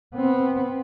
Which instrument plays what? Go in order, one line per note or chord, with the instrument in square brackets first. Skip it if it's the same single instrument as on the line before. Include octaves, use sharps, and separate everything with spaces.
[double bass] B3 C4